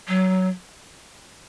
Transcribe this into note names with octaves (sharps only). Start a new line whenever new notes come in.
F#3